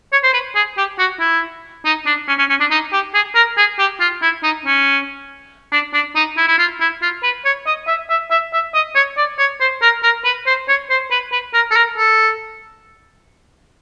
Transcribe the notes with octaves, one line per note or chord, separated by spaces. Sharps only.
C#5
C5
B4
G#4
G4
F#4
E4
D#4
D4
C#4
C#4
C#4
D4
D#4
G4
G#4
A#4
G#4
G4
F4
E4
D#4
C#4
D4
D4
D#4
E4
E4
F4
E4
F4
B4
C#5
D#5
E5
E5
E5
E5
D#5
C#5
D5
C#5
C5
A#4
A#4
B4
C5
C#5
C5
B4
B4
A#4
A4
A#4
A4